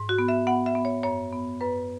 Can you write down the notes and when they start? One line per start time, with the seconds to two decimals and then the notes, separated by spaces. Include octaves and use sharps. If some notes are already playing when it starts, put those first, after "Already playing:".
Already playing: G#2
0.09 F#4
0.19 B3
0.28 E5
0.47 B3 F#5
0.66 E5
0.75 B3
0.85 C#5
1.03 F#2 C#5
1.32 B3
1.60 F#2 B4